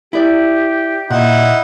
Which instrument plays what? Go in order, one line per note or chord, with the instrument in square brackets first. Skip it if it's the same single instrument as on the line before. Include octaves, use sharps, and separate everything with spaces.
[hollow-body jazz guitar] E4 D5 [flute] G4
[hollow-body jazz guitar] A#2 [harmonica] D#4 E4 F#5